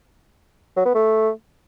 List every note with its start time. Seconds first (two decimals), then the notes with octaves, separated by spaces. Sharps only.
0.77 F#3
0.86 B3
0.95 A3